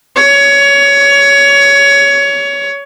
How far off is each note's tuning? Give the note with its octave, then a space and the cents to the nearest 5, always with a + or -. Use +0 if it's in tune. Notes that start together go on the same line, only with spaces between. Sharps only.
C#5 +20